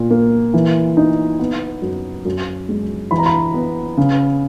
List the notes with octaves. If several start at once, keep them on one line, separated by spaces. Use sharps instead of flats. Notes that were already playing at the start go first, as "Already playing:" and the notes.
Already playing: A#2
A#3
E3
D#4
B3
F#2
F#2
G#3
E3 B5
A#5
B5
B3
C#3